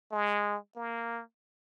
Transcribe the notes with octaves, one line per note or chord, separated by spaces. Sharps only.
G#3
A#3